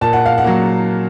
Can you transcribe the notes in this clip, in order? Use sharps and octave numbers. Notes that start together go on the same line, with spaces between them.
A#2 A5
F#5
F5
F#5
F#3 A#3